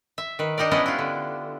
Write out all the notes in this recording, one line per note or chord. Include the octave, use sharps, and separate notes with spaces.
E5
D#3 B4
D4 D#4 G4 A#4 D5
G3 B3 C#4 D4 E4 D#5
E4 F4
D3